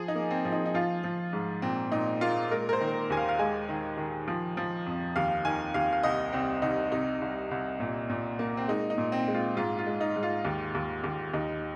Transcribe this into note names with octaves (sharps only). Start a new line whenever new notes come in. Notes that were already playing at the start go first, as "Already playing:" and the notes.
Already playing: F3 G#4
D#4
A#3
C4
F3
D#4
D#4
F3 F4
F3
G#2
A#2 C4
A#2 D#4
A#3 F4
G#3 A#4
A#4
C5
D#3
D#2 G#5
F5
F5
G#3 G#5
D#3
D#3
F3
F3
F2
D#2 F5
D#3 G#5
D#2 F5
F5
C2 D#5
C2 C4
C2 D#4
C3 D#4
C2
C2
A#2
A#2
A#3
C4
G#3 D#4
D#4
A#2
C4
G#3
F4
G#2 F4
F4
G#3
D#4
G#2
F4
D#2
D#2
D#2
D#2 D#4